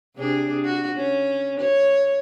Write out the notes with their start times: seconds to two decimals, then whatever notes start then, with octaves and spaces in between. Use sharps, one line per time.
0.16 C3 D4 G#4
0.64 F#4
0.97 C#4
1.60 C#5